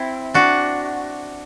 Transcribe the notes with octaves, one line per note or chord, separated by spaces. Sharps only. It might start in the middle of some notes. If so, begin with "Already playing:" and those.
Already playing: C4 E4
D4 F#4